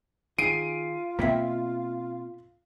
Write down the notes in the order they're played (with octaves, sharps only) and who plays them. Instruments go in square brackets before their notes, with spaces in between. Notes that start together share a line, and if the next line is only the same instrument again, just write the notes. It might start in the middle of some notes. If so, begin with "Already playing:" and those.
[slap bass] D#3 [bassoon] F4 [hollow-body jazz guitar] G#4 [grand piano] C7 D7 D#7
[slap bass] B2 A#3 C4 [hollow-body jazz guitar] E5 G5 B5